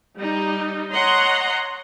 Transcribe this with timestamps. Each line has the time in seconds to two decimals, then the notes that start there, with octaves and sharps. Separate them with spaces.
0.17 G3 D#4
0.92 C#5 D#5 F#5 A#5 C6